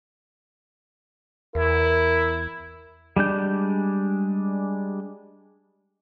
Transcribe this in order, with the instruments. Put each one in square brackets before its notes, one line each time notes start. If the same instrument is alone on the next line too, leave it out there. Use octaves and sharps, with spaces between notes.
[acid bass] E2 [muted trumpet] E4 [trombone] A#4
[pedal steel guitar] G3 G#3 D4 G6